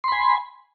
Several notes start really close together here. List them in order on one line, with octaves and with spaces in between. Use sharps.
C6 B5 G#5